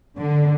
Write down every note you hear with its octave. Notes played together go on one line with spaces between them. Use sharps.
D3